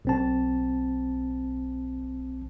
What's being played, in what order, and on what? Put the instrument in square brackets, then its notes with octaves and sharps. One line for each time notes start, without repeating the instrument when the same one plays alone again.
[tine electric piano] B1 C4 A5